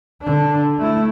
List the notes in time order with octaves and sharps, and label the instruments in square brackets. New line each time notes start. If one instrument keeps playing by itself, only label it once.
[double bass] D3 D4
A3 E4